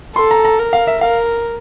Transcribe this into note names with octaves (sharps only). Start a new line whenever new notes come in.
A4 C6
A#5
A#5
A#4
F5
E5
A#4 F5